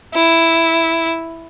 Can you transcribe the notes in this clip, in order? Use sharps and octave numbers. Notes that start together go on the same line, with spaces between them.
E4